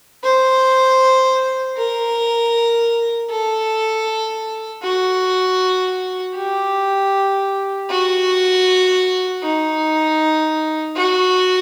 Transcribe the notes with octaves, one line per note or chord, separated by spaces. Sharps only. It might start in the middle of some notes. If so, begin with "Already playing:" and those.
C5
A#4
A4
F#4
G4
F#4
D#4
F#4